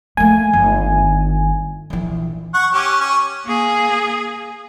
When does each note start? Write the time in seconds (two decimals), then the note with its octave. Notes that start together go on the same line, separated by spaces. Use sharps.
0.17 A3 A#3 G#5
0.53 G1 D#3
1.90 A#1 E3
2.54 F#5 C#6
2.73 C#4 G4
3.01 C#4
3.45 A#3 G#4